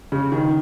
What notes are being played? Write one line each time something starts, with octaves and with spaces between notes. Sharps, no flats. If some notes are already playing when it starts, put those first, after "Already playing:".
C#3
D#3